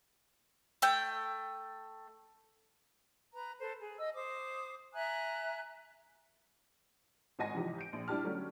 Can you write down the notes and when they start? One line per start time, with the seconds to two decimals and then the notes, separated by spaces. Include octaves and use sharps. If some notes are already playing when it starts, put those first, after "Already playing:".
0.82 A3 G5
3.33 B4 A#5
3.60 A4 B4 C5
3.79 G#4
3.98 D#5 E6
4.15 C5 D6 D#6
4.93 E5 G#5 A#5 F#6
7.39 G#1 F#4 D#5 G#5 A#6
7.54 C3 E3 F3 D#4 G4
7.78 G6 D7
7.93 A#1
8.08 G3 D4 E4 G4 A5 F6
8.24 D3 F#3 G3 A3 C#4